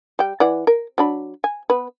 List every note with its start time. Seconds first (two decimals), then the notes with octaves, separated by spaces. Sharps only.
0.19 G3 G5
0.40 E3 D5 F#5
0.67 A#4
0.98 F#3 D4 B5
1.44 G#5
1.70 B3 B4